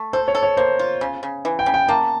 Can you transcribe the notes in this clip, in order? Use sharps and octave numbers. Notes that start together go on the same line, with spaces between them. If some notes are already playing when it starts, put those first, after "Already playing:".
Already playing: A3
A4 C5
C#5
A4
C#5
A#3 C5
F4
C#3
C#3
E3
G5
C#3
G5
A#3 A5